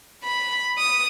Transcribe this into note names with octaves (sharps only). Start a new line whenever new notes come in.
B5
D#6